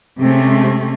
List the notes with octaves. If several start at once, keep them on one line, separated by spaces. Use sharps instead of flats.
C3 G#3 A3 C4 C#4